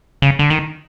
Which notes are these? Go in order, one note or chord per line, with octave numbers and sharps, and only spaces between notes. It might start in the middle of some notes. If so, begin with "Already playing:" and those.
C#3
D3
D#3